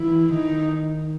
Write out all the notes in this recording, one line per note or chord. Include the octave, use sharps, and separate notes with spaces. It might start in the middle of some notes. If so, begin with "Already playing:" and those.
Already playing: E3 E4
D#3 D#4